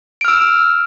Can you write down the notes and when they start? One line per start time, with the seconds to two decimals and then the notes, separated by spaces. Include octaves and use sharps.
0.21 D7
0.25 F6
0.28 E6